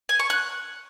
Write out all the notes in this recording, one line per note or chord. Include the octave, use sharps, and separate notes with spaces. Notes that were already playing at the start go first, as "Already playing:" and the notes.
G#5
C#6
F#6